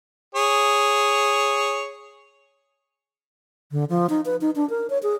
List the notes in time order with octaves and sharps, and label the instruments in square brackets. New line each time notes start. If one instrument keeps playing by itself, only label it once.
[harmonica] G#4 C#5
[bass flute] D3
F3
D#4
B4
D#4
D4
A#4
C#5
G#4